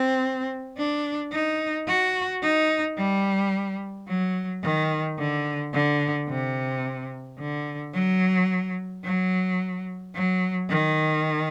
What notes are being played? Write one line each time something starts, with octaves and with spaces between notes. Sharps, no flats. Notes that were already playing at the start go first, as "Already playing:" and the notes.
Already playing: C4
D4
D#4
F#4
D#4
G3
F#3
D#3
D3
D3
C3
D3
F#3
F#3
F#3
D#3